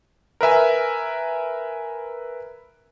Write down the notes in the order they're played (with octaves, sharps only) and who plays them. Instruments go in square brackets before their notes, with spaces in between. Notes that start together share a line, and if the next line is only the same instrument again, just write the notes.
[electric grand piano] A#4 B4 E5 G#5